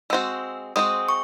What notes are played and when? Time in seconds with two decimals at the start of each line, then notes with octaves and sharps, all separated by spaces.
0.10 G#3 C4 F#4 E6
0.76 G#3 C4 F#4 D#6
1.09 C#6